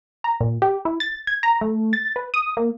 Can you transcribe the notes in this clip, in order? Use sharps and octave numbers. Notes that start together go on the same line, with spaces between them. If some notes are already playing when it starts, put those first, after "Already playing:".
A#5
A#2
G4
E4
A6
G#6
A#5
A3
A6
B4
D#6
A#3